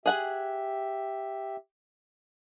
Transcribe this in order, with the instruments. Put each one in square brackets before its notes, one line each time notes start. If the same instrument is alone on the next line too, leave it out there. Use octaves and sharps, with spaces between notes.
[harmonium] G4 E5 [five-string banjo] G#4 F#5 G#5